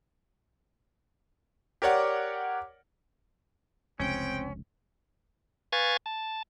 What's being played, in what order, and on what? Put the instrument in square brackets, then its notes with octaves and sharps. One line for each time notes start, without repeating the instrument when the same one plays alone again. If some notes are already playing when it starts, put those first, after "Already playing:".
[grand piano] G4 A#4 C#5 D5 F#5
[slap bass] F1 C#2 [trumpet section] G#3 G5 [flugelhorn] C4 [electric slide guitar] C#4
[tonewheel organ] B4 F5 G#5 C#6 G#6 A6
A5